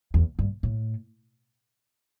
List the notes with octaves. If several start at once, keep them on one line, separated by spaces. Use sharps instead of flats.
E2
G2
A2